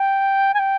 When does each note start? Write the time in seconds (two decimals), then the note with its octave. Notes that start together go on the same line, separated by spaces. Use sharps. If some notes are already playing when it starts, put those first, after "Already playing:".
Already playing: G5
0.54 G#5
0.59 G5